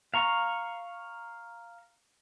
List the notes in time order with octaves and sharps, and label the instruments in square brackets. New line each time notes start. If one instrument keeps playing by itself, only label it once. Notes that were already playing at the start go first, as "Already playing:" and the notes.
[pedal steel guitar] F5 A#5 C#6